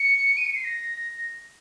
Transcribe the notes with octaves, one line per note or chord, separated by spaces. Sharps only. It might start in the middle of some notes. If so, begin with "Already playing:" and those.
Already playing: C#7
D#7
C#7
C7
A#6